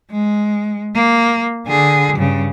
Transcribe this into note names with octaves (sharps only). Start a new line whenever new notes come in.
G#3
A#3
D3 G#4
G2 C#3